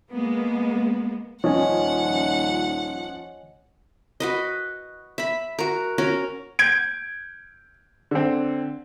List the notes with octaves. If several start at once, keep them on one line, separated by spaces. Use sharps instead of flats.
G#3 A#3 B3
D#1 F3 C#4 C#5 D#5 F#5 G#5
F#4 B4 D#5
E5 B5
F#4 A#4
C#4 F#4 A#4
G6 G#6 D7
D3 C4